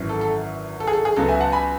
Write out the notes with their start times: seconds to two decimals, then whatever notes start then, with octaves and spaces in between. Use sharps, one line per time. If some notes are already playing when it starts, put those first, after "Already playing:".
Already playing: G#1 F#2 E3
0.09 A4
0.21 A4
0.80 A4
0.87 G#4
0.93 A4
1.05 G#4
1.16 C#2 C#3 F#3 B3 A4
1.29 E5 G#5
1.40 F#5 A5
1.52 G#5 B5